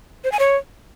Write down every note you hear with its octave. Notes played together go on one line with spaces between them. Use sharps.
C5
G#5
C#5